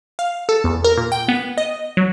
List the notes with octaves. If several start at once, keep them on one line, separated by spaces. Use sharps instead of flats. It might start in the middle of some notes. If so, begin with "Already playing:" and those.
F5
A4
E2
A#4
A#2
G5
B3
D#5
F#3